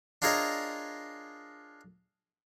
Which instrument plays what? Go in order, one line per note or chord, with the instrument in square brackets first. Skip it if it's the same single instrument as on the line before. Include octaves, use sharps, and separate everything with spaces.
[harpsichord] D4 F4 G#4 A#4 C#5 D#5